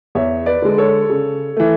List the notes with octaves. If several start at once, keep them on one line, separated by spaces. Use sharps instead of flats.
E2 C#5 E5
B4 D5
D3 G#3
A4 C#5
C#3
E3 A3